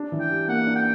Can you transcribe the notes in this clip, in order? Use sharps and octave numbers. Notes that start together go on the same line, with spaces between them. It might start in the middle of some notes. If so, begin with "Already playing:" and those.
Already playing: D4
E3
G5
G3
A#3 F#5
D4
G5